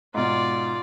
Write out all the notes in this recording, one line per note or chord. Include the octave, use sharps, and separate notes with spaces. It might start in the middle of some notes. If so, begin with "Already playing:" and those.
G#2 B2 F4 D5